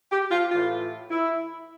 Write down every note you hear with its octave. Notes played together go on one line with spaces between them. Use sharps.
G4
F4
A2 E3 F4
E4